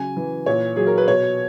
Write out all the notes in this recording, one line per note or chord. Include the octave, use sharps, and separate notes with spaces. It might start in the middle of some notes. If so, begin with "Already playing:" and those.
Already playing: C#3 F#3 G#5
E3
A#2 C#5
F#3 G#4
A#4
B4
B2 C#5